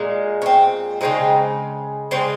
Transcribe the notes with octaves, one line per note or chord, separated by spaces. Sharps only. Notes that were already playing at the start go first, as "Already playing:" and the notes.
Already playing: A#2 G#3
C#4
C4
C#3 F3 G#3 C4 D#4
C#3 G#3 C4